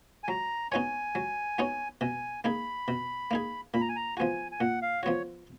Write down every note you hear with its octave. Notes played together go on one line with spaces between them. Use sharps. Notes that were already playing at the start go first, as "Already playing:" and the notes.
G#5
F#3 A#5
B3 D#4 F#4 C#5 G#5
F#3
B3 D#4 F#4 C#5
B2 G#5
A#3 D#4 G#4 B5
B2
A#3 D#4 G#4
A#2 B5
A#5
G#5
A#5
F3 B3 F#4 G#5
G#5
A#2 F#5
F5
F3 B3 F#4 C#5